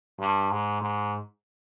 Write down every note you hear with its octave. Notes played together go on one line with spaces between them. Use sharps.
G2
G#2
G#2